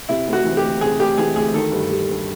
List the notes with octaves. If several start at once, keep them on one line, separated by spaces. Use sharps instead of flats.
C3 E4
D2
F#4
E3
G4
D2
C3 G#4
D2 G4
E3 G#4
D2 G#4
D#3 A4
G2
G3
G2